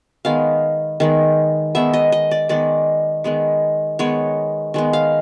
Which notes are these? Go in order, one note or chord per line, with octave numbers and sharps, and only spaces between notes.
D#3 G#3 B3 F5
D#3 G#3 B3
D#3 G#3 B3 E5
D#5
D#5
D5
D#3 G#3 B3 D5
D#3 G#3 B3
D#3 G#3 B3 C#5
D#3 G#3 B3
F5